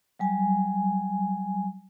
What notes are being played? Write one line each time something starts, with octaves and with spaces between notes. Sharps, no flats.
F#3 G3 G#5